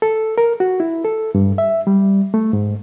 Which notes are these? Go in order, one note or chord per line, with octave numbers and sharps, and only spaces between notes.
A4
A#4
F#4
E4
A4
G2
E5
G3
A3
G#2